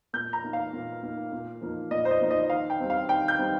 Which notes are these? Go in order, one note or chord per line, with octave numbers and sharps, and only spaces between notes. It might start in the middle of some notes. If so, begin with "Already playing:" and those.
A#2 G6
A#5
A#3 D#4
F5
A#2
A#3 D#4
A#2
F3 A#3 D#4
A#2 D#5
C5
D#5
F3 A#3 D#4
D#5
D#3 F5
G5
G3 C4 D#4
F5
D#3 G5
G6
G3 C4 D#4